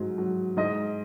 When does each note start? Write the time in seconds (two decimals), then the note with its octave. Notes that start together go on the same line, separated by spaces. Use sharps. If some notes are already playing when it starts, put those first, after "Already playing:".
Already playing: G#2 F#3
0.18 F#3
0.57 G#2 D#5